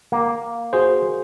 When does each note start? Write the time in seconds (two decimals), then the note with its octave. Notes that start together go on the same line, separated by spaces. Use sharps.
0.12 A#3
0.73 F#4 G#4 C5